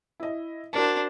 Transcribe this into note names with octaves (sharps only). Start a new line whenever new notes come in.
E4 D#5
D4 F#4 A#4 C5 A5